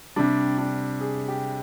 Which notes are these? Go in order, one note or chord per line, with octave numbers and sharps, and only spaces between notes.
C3 G3 D4
D4
G#4
G4